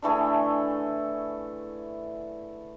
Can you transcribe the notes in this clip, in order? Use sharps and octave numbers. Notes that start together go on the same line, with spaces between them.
D3 E3 A3 G#4